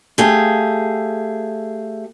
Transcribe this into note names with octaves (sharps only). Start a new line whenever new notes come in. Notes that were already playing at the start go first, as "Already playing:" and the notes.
A3 G4 G#4 F5